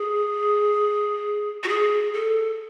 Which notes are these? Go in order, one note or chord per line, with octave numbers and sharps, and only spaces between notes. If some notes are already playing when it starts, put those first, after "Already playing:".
Already playing: G#4
F#4
G#4
A4